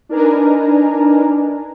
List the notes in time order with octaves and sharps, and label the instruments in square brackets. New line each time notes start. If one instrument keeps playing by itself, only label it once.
[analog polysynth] D4 D#4 A#4 B4 G#5 A#5